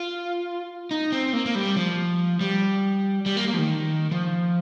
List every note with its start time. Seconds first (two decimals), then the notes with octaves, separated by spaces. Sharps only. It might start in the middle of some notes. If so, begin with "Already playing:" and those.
Already playing: F4
0.91 D#4
1.12 C4
1.33 A#3
1.46 A#3
1.55 G3
1.76 F3
2.41 G3
3.26 G3
3.37 A#3
3.48 A#3
3.54 F3
3.58 D#3
4.11 F3